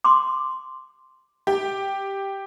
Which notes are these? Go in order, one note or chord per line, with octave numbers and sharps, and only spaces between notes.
C6 D6
G4